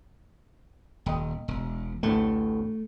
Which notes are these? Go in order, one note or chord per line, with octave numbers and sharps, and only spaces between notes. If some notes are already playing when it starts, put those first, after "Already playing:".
D#1 D#5 G5
E1
A1 D2 A2 A3